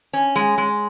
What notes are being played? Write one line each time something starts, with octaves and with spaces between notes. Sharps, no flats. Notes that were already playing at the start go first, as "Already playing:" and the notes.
C#4
G#3
G#3